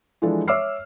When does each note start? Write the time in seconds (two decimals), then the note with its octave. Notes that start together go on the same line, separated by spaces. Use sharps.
0.22 E3 F3 G#3 D4 A4
0.48 C#5 E5 D6 E6 F6 C7